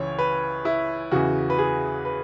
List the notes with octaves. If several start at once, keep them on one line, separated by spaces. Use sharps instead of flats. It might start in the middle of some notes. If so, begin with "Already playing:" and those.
Already playing: C#2 C#3 E3 C#5
B4
E4
E2 C#3 E3 F#4
B4
G#4
B4